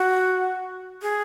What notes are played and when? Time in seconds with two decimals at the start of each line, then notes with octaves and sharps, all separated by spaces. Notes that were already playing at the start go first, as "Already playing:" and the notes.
Already playing: F#4
1.02 G#4